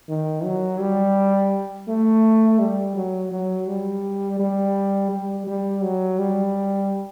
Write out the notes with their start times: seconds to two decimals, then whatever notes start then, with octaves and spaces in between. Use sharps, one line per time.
0.08 D#3
0.44 F#3
0.80 G3
1.88 A3
2.59 G3
2.96 F#3
3.32 F#3
3.67 G3
4.39 G3
5.11 G3
5.47 G3
5.83 F#3
6.19 G3